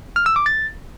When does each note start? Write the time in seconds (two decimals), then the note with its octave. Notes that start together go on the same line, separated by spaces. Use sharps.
0.16 F6
0.26 E6
0.36 D6
0.46 A6